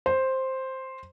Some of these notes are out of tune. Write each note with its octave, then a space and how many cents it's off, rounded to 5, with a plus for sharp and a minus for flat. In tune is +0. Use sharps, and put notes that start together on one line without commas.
C5 +5